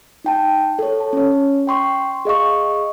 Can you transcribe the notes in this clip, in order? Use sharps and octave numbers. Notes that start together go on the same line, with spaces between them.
D#4 G5 A5
A4 C#5
A5
C#4 C#5
G5 C6 C#6
G#4 D#5 F5 C#6